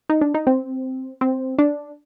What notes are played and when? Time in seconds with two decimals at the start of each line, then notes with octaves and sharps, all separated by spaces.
0.10 D#4
0.21 D4
0.34 D#4
0.47 C4
1.21 C4
1.58 D4